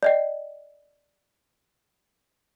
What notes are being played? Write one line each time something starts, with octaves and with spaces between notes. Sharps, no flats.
D5 D#5 G5